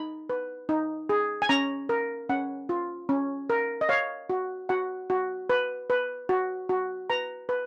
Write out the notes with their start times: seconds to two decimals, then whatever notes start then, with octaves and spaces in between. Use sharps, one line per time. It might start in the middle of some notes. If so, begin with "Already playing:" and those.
Already playing: D#4 B5
0.30 B4
0.69 D#4
1.09 G#4
1.42 G#5
1.49 C#4 A#5
1.89 A#4
2.29 C#4 F#5
2.69 F4
3.09 C#4
3.50 A#4
3.81 D#5
3.89 C#5 F5
4.30 F#4
4.69 F#4 F#5
5.10 F#4
5.50 B4
5.90 B4
6.29 F#4
6.69 F#4
7.10 B4 A#5
7.49 B4